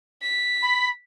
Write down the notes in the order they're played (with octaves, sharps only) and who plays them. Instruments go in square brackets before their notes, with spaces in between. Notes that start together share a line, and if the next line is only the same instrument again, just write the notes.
[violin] B6
[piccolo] B5